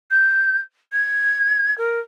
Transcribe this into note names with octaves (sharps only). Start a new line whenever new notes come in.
G6
G#6
A#4